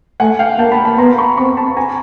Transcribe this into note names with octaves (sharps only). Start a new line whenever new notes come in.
A3 F#5 G#5
F5 G5
A#3 G5 A5
A5 B5
A5 B5
B3 A#5 C6
B5 C#6
C4 B5 C#6
A5 B5
G#5 A#5